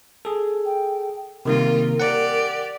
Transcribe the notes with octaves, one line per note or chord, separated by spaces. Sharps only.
G#4 A4
G5
C3 D#3 G3 A#3 F4 A#4
G4 D5 F#5